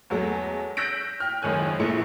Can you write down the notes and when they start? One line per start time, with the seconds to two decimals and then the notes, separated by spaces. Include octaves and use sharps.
0.10 E2 F#3 G#3 A3
0.77 E6 F#6 G6 A#6 B6 D7
1.20 G5 F6
1.42 F#1 C#2 D#3 C#4 G#5 F#6
1.79 A#1 A#2 G#3 E4 C#7